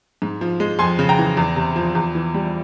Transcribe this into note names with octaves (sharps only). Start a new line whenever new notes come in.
G#2
F3
G#3
F2 G#5 C6
C#3
G5 A#5
E3
E2
C3
F3
E2
E3
G3